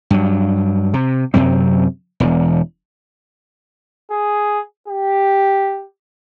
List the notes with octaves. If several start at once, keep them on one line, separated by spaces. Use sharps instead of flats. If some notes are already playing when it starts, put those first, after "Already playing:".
G2 F#3
C3
F#2 C3 F#3 C4
E1 E2
G#4
G4